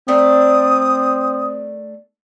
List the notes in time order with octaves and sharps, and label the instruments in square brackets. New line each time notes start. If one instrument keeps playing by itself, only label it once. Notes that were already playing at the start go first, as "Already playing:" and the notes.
[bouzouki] A3 D4 A#4 [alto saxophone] C4 [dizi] D#6